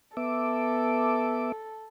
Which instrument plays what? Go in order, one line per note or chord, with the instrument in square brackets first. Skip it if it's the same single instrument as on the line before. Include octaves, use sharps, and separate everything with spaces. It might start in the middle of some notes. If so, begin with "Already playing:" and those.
[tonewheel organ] B3 E5 D6 [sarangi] A4